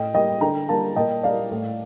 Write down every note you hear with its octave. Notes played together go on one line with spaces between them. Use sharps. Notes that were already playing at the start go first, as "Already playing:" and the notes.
Already playing: A2 D#5 G5
G3 A#3 D#5 G5
D3 G5 A#5
G3 A#3 F5 A5
A#2 D#5 G5
G3 A#3 D5 F5
A2